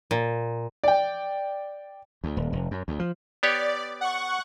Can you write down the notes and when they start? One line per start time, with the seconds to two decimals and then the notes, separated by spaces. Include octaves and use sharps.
0.11 A#2
0.84 D5 G5
2.24 D2
2.37 D#1
2.53 F1
2.71 F#2
2.88 D2
2.99 F3
3.43 B3 G4 C#5 D5
4.01 F#5 C#6